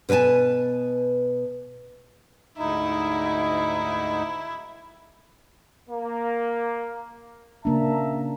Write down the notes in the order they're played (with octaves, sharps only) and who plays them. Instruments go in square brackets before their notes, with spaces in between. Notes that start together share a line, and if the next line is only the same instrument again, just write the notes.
[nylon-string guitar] B2 B4 D5 G#5 A5
[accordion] D2 G#2 D#4 [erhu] E4
[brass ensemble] A#3
[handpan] C#3 A#3 D4 [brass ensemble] E5 A5 A#5